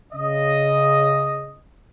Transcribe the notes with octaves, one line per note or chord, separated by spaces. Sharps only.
C#3 D#5